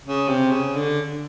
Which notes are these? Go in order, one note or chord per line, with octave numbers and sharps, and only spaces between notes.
C#3
C3
C#3
D3